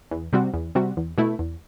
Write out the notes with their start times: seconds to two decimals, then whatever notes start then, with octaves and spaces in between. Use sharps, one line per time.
0.11 E2
0.33 C3 G3 C4 F#4
0.54 E2
0.75 C3 G3 C4 F#4
0.97 E2
1.18 B2 A3 E4
1.39 E2